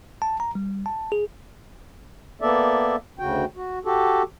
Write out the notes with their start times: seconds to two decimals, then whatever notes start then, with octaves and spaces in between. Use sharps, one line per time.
0.22 A5
0.40 A#5
0.55 G3
0.86 A5
1.12 G#4
2.41 A#3 B3 A4 D5 E5
3.19 D2 C#3 F#4 G5
3.56 F#4
3.85 F#4 G4 A4